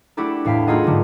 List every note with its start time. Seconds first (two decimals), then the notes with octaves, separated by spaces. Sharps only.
0.17 A3 D4 E4 F#4 G4 A4
0.45 E2 A2 F5 G5 B6
0.67 A3 D#4 F4 G#4 D#5 F#5
0.84 G#2 D3 G3 A#3